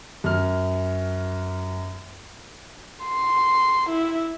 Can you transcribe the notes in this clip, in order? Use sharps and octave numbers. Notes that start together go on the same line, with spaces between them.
F#2 F6
C6
E4